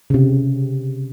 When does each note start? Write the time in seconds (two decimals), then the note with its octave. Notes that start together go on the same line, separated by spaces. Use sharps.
0.10 C#3
0.14 C3